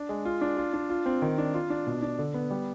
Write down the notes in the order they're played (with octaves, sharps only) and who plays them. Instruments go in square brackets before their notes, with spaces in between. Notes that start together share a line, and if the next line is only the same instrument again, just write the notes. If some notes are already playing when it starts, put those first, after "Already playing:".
Already playing: [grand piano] D4
G#3
F4
D4
F4
D4
F4
C4
D#3
D4
F4
D4
B2
D4
D3
B3
G3